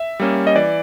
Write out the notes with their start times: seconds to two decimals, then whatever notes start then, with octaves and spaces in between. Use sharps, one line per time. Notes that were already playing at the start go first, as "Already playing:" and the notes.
Already playing: E5
0.20 G3 A#3 C#4
0.47 D#5
0.55 E3 D5